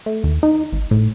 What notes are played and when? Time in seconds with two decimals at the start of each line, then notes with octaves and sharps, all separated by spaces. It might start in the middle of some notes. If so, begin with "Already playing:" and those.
0.06 A3
0.24 D#2
0.43 D#4
0.72 G#1
0.91 A2